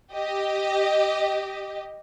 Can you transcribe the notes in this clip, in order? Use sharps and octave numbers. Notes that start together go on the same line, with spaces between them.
G4 D#5